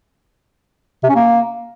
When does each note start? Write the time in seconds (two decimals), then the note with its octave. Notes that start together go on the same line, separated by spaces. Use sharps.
1.04 C3
1.10 C#4
1.15 A#3